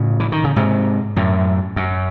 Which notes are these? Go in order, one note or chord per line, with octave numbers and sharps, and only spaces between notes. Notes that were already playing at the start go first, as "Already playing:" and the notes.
Already playing: A2 C#3
E3
D#3
C#3
G#2 C3
F#2 A2
F#2